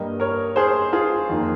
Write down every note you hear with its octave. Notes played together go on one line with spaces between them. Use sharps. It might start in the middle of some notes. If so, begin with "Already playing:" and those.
Already playing: G2 G3 A#3 D#5
A#4 C#5
G#4 C5
F4 G#4
F2 D#3 A#3